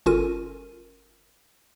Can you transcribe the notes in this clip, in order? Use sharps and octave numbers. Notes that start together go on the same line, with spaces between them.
G1 C#4 F4 A4 A#4 D#7